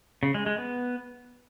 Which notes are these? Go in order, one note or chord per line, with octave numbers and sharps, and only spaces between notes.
C#3
G#3
G#3
B3